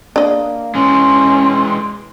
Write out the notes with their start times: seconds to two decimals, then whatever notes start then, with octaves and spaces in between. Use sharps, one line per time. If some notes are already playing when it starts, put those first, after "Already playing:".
0.16 A#3 D4 D#5
0.75 E3 G#3 C#4 C6